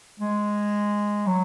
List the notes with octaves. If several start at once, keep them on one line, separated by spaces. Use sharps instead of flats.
G#3
F#3